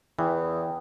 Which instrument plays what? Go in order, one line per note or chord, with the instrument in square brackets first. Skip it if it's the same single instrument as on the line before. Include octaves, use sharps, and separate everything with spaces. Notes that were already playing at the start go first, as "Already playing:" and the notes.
[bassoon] E2 [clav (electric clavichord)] E3 [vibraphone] G5 D#6